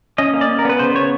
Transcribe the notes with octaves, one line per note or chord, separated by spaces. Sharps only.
C#4 D#5
A#3
D5
C#4
A#4
B3 B4
C#3 C5
B3 C#5